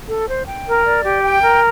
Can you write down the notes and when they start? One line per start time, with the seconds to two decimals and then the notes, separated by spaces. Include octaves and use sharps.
0.09 A4
0.28 C5
0.47 G5
0.67 A#4
0.85 D5
1.04 G4
1.24 G5
1.43 A#4